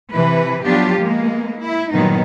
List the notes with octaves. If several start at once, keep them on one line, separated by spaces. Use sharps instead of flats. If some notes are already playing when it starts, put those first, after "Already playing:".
C3 E3 B4
F3 F#3 B3 D4 F4 G4
G#3 A#3 B3
E4
G2 A#2 D#3 F#3 B3 D#4